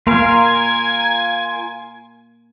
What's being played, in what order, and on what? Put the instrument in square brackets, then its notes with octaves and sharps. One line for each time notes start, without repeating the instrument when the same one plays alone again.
[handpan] A#3 [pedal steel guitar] F4 A#4 F5 [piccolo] G#5